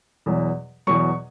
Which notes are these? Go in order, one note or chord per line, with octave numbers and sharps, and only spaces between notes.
E2 B2 F#3
E2 B2 F#3 C#6